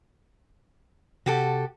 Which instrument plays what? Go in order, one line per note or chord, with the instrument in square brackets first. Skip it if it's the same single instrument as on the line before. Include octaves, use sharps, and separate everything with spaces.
[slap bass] C3 [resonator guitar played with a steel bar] F#4 G4 A4